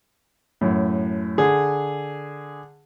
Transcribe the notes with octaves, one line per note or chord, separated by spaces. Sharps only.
F#2 A2
D3 G#4